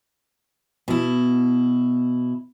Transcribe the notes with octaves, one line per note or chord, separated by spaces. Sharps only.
B2 E4